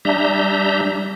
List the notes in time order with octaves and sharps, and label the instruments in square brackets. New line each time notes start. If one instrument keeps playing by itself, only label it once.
[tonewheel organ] G3 D4 E5 A#5 G6